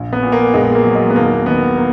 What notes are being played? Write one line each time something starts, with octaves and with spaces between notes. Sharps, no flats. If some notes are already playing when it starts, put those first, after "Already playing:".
Already playing: A#1
B3
A#2
A#3
A#1 G#3
A#3
F#3
G#3
B3
D#2 A#3
D#3 B3
A#3